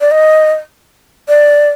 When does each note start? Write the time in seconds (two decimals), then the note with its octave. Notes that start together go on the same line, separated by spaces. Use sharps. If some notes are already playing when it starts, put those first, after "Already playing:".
0.01 D5
0.11 D#5
1.28 D5